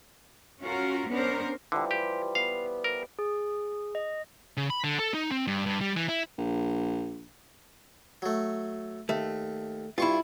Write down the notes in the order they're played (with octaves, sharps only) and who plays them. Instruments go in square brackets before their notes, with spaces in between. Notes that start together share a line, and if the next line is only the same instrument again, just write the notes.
[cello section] C#4 F4 F#4 A#4
B3 C#4 D4 A#4 C5
[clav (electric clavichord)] D3 [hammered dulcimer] E3 F3 G3
[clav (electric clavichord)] G4 [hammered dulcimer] C5
[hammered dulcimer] B3 [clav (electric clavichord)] F5
[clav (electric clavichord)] A#4
[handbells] G#4
D#5
[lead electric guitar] C#3
B5
D3
A4
D#4
C4
G2
G2
G3
E3
E4
[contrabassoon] A#1
[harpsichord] F#3 A3
[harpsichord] D#2 [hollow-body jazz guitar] A3
[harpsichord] G2 C#6 [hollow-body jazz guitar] E4 F4